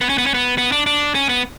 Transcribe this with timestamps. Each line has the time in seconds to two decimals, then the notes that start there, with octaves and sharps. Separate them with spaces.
0.01 B3
0.09 C#4
0.18 B3
0.26 C#4
0.34 B3
0.58 B3
0.72 D4
0.86 D4
1.15 C#4
1.29 B3